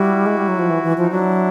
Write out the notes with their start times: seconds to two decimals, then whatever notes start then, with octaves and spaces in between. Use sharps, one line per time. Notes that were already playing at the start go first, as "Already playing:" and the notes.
Already playing: G3 E4 F#4
0.26 G#3
0.37 G3
0.48 F#3
0.59 F3
0.70 E3
0.83 E3
0.97 F3
1.02 D#4
1.11 F#3 D4 E4